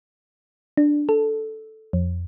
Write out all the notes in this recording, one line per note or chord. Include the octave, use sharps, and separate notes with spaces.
D4
A4
F2